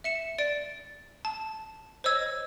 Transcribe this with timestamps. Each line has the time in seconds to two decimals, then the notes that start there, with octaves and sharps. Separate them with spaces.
0.04 E5 C#7 E7
0.38 D5 A6 D7
1.25 A5
2.04 C5 C#5 D#5 E6 G#6